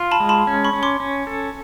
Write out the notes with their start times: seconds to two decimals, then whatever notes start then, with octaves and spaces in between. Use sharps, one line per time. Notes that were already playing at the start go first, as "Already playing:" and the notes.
Already playing: F4
0.11 A5 B5
0.20 G#3
0.29 A5 B5
0.47 C#4
0.64 B5 C#6
0.73 C#4
0.83 C6 D6
1.00 C#4
1.27 A4